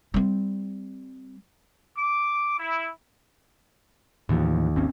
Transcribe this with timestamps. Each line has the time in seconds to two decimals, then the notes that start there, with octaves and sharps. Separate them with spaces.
0.14 G3 C4
1.98 D6
2.59 E4
4.29 D#2 A2 E3 F3
4.76 G#1 C4 C#4